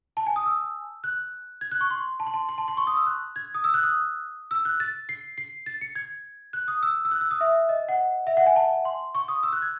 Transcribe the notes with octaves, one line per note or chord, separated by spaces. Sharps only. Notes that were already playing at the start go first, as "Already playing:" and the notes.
A5
G#5
D#6
E6
F#6
G#6
F#6
C#6
C6
A5
C6
A5
C6
A5
C6
C#6
D#6
E6
F#6
G#6
D#6
E6
F#6
D#6
E6
F#6
A6
C7
C7
A6
C#7
G#6
F#6
D#6
E6
E6
F#6
E6
D#6
E5
D#5
F#5
E5
F#5
G#5
A5
C6
C#6
D#6
E6
F#6
G#6